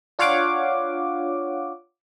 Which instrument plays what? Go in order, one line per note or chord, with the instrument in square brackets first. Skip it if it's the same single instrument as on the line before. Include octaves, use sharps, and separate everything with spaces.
[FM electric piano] D4 F4 C#5 F5 F#5 D6